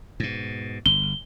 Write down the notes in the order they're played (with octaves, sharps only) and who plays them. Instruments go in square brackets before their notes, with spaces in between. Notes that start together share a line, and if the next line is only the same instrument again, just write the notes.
[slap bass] G#2 B2
[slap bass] G1 [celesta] G7